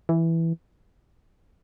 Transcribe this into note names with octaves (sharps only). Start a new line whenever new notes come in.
E3